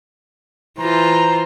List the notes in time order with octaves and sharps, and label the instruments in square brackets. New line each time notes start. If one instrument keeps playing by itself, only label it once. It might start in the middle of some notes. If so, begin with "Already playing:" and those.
[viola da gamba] E3 F4 [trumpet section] C5 A#5